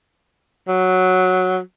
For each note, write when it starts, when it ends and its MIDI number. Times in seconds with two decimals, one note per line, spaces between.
0.68 1.59 54